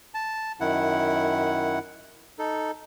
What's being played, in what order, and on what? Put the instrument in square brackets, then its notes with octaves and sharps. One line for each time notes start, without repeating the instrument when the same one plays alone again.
[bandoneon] A5
F#2 D#3 E4 F#5
D#4 A4